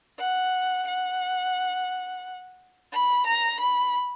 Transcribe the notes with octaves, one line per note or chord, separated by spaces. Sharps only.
F#5
F#5
B5
A#5
B5